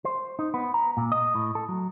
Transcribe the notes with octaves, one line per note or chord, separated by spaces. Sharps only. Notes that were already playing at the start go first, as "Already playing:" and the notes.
C5
D#4
B3
A#5
A#2
D#5
A2
A4
F#3